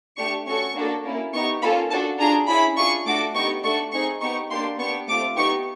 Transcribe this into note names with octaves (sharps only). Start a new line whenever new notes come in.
A3 D4 G4 C#6
C#4 F#4 A4 C#6
A#3 D4 F#4 A4
A#3 C#4 E4
B3 D#4 G4 C#6
A#3 C#4 F4 A4 B5
D4 F#4 A4 A5
D4 F4 G#4 A#5
C#4 E4 G#4 B5
D4 F4 G#4 C#6
A3 D4 F#4 A4 D6
B3 D#4 G4 C#6
A3 D4 F#4 A4 C#6
C4 D#4 G#4 C#6
B3 D#4 G4 C#6
A#3 D4 G4 C6
B3 D4 G4 C#6
A3 C4 F4 D6
B3 D#4 G4 C#6